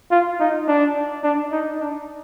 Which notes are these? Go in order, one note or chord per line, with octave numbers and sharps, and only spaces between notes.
F4
D#4
D4
D4
D#4
D4